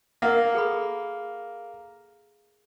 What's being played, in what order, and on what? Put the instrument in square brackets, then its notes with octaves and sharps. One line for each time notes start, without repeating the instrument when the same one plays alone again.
[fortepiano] A#3 [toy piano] A#4 D#5 F#5
[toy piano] G#4 A4 B5